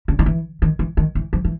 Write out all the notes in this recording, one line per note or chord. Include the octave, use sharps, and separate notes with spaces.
C#3
D#3
E3
D#3
E3
D#3
E3
F3
E3